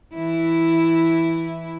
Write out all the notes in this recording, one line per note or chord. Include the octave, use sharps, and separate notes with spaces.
E3 E4